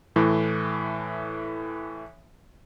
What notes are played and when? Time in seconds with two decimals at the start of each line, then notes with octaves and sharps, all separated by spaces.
0.16 A2 E3 A3